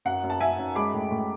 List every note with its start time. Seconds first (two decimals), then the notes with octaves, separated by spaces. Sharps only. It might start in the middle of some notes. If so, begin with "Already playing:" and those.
0.05 F#2 F#5
0.23 F#2
0.30 A5
0.40 F#2 E5 G#5
0.59 F#2
0.75 G#3 B5 D6
0.93 A2
1.11 A2